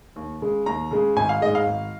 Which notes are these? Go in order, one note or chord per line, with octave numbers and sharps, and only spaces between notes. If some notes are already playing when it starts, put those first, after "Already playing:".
D#2
C#3 G#3
D#2 A#5
C#3 G#3
G#1 G#5
F5
G#2 G#3 D#5
F5
G#1